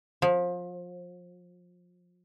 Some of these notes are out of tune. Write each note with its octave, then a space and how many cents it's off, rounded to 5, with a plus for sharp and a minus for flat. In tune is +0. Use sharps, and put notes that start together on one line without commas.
F3 +25